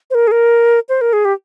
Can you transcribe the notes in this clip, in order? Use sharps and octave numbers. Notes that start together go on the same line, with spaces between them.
C5
A#4
G#4
A#4
C5
A#4
G#4
G4